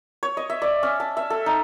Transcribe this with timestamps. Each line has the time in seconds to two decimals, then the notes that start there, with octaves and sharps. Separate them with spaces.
0.23 C#5
0.37 D#5
0.50 E5
0.62 D5
0.83 C#4
1.00 A5
1.17 E5
1.30 A4
1.46 D#4